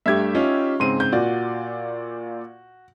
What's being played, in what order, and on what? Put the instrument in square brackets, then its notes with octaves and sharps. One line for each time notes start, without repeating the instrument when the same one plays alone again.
[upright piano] G2 A3 G#6 [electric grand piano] G4 E5
[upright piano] C#4 D#4 F4
[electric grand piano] G#2 C#3 C4 [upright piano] C6 D#7
[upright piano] G6
[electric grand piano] A#2 F4 D5 [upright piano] F#4